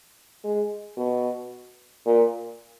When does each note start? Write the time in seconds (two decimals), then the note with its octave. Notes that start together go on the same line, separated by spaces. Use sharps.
0.44 G#3
0.97 B2
2.06 A#2